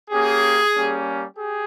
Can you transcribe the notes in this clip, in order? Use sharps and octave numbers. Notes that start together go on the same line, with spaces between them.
A#3 C#4 G4 G#4
G3 A#3 C#4 G4
G4 G#4